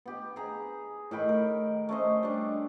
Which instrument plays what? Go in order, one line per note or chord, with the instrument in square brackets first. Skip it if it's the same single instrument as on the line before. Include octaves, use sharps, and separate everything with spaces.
[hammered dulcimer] B3 G4
G#4 A#5
A2 D#3 G5 B5
A#4
A3 C#4 C5 D#5
G3 D4